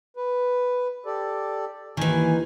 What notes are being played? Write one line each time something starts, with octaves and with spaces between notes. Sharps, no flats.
B4
G4 A4 D5
D#2 D#3 E3 G#5